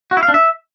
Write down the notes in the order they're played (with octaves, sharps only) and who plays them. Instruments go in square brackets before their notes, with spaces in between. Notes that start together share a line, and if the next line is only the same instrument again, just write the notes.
[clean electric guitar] F#4
E4
F5
D4
E5